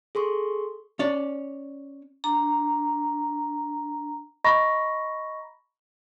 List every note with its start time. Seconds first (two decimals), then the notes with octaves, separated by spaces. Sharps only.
0.15 G#4 A4 C6 C#6
0.99 C#4 C#5 D5
2.24 D4 A#5
4.44 D#5 A#5 B5 C#6 A#6